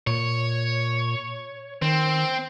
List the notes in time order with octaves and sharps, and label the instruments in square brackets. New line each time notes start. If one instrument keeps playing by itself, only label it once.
[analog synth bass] A#2 [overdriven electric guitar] C#5
[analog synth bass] D#3 [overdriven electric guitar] C4